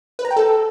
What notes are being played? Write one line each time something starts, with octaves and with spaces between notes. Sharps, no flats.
B4
A#5
G5
A4